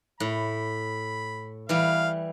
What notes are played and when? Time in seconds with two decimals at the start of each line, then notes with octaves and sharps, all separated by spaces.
0.20 A2 B5
1.69 E3 G3 F5